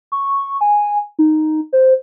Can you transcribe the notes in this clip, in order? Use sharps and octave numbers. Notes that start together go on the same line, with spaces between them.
C#6
G#5
D#4
C5